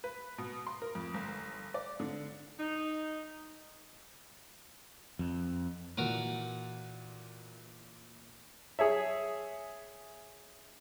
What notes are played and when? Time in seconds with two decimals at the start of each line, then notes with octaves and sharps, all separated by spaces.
0.04 B4
0.38 B2
0.67 C6
0.82 A#4
0.95 F2
1.14 G1
1.74 D5
2.00 D3
2.59 D#4
5.19 F2
5.97 A#2 E3 F#4 A#4 B4
8.79 G#4 C#5 E5